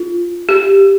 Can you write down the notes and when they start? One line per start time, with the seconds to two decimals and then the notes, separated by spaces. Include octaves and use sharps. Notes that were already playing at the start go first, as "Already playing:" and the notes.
Already playing: F4
0.49 G4